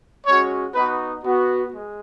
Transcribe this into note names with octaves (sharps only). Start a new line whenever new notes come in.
G#3 C#4 F#4 C#5
B3 D#4 F#4 B4
B3 F#4
G#3